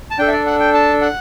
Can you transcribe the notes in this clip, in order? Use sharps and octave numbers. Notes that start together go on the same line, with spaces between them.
A5
D4 A4 G5
E5
D5
F#5
G5
A5
F#5